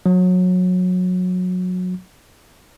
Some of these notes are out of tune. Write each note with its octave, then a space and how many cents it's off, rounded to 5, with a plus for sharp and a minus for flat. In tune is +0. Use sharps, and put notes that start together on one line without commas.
F#3 -25